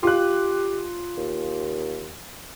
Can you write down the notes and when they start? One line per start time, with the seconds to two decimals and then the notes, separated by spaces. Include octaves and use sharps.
0.03 F4 G4 F#6
1.17 D#2